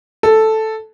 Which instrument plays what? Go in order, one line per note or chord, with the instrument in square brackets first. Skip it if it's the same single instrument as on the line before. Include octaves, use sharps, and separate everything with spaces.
[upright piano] A4